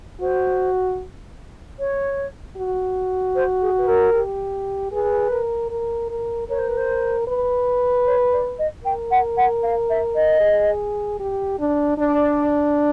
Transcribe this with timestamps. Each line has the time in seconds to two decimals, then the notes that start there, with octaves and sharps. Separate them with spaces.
0.21 F#4 C5
1.78 C#5
2.57 F#4
3.35 C5
3.61 G#4
3.78 B4
3.87 A#4
4.14 G4
4.92 G#4 B4
5.31 A#4
5.71 A#4
6.10 A#4
6.48 A#4 C#5
6.58 C5
6.68 B4
6.77 C5
7.27 B4
8.06 C#5
8.32 D5
8.58 D#5
8.84 A#4 G5
9.10 F#5
9.36 F#5
9.63 F5
9.89 E5
10.15 D#5
10.41 G#4
11.20 G4
11.59 D4
11.98 D4 D5